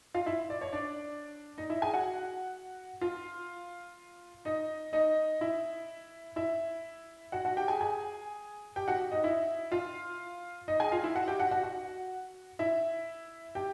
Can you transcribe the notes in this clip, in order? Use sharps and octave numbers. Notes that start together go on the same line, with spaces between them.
F4 F5
E4 E5
D5
C#5
D4 D5
D#4 D#5
E4 E5
G#4 G#5
F#4 F#5
F4 F5
D#4 D#5
D#4 D#5
E4 E5
E4 E5
F#4 F#5
F#4 F#5
G4 G5
G#4 G#5
G#4 G#5
G4 G5
F#4 F#5
D#4 D#5
E4 E5
F4 F5
D#4 D#5
G#4 G#5
F4 F5
E4 E5
F#4 F#5
G4 G5
F#4 F#5
F#4 F#5
F#4 F#5
E4 E5
G4 G5